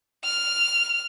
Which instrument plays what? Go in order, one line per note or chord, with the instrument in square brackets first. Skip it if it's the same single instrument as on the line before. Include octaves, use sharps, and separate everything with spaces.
[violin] F6